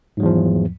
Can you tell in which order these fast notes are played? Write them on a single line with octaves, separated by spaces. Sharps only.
G#2 F#3 E2 F3